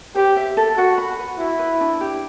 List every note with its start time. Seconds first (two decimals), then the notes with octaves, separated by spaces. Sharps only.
0.15 G4 C5
0.36 E5
0.57 A4
0.77 F#4 F#5
0.98 B5
1.19 B4
1.39 E4 F#4
1.59 B4
1.81 D4
2.01 G4